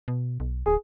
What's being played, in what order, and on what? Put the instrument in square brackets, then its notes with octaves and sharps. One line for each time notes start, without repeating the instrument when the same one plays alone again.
[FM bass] B2
B1
[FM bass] D1 [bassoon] G#4